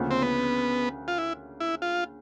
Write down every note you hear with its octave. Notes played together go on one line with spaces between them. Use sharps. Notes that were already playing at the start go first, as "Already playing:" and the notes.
Already playing: D2 C#3 F3 A#3 C#4
C4
B3
F4
E4
E4
F4